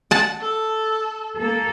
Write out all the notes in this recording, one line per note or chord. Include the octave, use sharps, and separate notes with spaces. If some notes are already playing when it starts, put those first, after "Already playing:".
F#5 A5
A4
A#3 A4